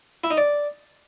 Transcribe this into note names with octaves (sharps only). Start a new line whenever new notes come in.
E4
D#4
D5